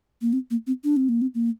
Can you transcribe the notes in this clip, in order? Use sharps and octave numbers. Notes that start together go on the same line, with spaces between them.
A#3
C4
A#3
C4
D4
C4
A#3
C4
A#3